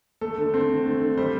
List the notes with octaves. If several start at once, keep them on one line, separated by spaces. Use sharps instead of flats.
A3 A4
D3
C4
D3
A3
D3
G3 C5